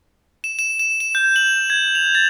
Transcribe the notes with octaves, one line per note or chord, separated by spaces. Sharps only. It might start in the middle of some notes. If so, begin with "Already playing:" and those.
E7
E7
E7
E7
G6
F#7
G#6
F7
A6